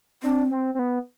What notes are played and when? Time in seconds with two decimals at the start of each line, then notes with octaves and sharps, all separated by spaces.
0.23 C4 D4
0.51 C4
0.75 C4
0.79 B3